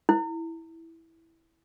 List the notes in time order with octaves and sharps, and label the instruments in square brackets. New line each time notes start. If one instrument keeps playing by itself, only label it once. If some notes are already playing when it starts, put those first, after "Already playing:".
[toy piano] E4